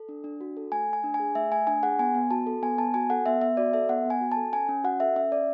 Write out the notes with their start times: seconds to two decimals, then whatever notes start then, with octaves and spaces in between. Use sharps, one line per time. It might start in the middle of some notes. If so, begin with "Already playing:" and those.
Already playing: A4
0.09 D4
0.24 D4
0.41 F#4
0.57 A4
0.72 A3 G#5
0.88 A3
0.93 G#5
1.04 D4
1.14 G#5
1.20 G#4
1.35 A3 E5
1.51 A3 G#5
1.67 D4 G#5
1.83 G#4 F#5
1.99 B3 G#5
2.15 B3
2.31 F#4 A5
2.47 A4
2.62 B3 G#5
2.78 B3 A5
2.94 F#4 G#5
3.10 A4 F#5
3.26 B3 E5
3.41 B3 E5
3.57 F#4 D5
3.73 A4 E5
3.89 B3 F#5
4.05 B3
4.10 G#5
4.21 F#4
4.32 A5
4.36 A4
4.53 C#4 G#5
4.69 C#4
4.84 F#4 F#5
5.00 A4 E5
5.16 C#4 E5
5.32 C#4 D5